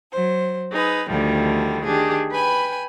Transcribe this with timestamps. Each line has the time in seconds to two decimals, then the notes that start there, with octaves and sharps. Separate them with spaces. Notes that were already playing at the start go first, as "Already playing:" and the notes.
0.10 F#3 C5
0.72 D#4 G#4 B4
1.07 D2 D3 D#3 F3 G3
1.84 D#3 D4 G4 G#4
2.31 B4 G5 G#5 B5